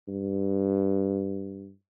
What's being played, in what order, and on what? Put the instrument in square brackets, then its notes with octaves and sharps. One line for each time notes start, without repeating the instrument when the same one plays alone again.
[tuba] G2